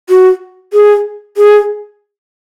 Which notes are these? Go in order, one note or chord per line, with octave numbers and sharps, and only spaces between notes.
F#4
G#4
G#4